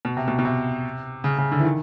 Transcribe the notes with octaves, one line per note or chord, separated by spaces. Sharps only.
B2
C3
B2
B2
C3
C#3
C#3
D3
E3
D#3